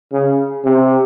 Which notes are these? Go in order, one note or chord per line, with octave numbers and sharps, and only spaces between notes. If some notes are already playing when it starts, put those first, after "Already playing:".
C#3
C3